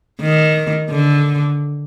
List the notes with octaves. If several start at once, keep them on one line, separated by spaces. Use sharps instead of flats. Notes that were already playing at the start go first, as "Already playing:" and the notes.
D#3
D3